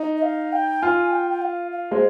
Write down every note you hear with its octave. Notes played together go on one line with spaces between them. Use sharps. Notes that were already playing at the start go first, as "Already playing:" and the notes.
Already playing: D#4
D#5
F5
G5
F4 G#5
G5
G5
F5
F5
G#3 C5